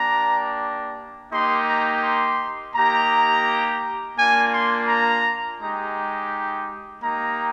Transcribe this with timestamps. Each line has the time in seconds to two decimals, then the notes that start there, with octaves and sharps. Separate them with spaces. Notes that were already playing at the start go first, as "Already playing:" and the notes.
Already playing: A#3 D4 G4 A#5
1.32 A#3 D#4 G4 C6
1.67 A#5
2.03 C6
2.74 A#3 D#4 G4 A#5
4.17 A#3 D4 F4 G#5
4.52 C6
4.88 A#5
5.59 G#3 D#4 G4 A#5
7.02 A#3 D#4 G4 A#5